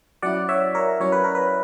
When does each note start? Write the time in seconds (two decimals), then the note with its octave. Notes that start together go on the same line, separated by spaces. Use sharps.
0.23 F#3 C#4 E4 D5 F#5
0.49 C#5 E5
0.75 A#4 C#5
1.00 F#3 C#4 E4 C#5
1.12 B4
1.24 A#4
1.35 B4